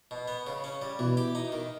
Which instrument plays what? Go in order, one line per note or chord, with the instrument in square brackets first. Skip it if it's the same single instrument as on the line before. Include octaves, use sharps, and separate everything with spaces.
[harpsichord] B2
B3
C#3
C#4
G3
[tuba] B2 [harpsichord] E3
[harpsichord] G4
D#4
D#3